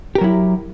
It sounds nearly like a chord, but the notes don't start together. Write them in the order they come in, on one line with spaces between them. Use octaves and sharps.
G4 A#4 F#3 E4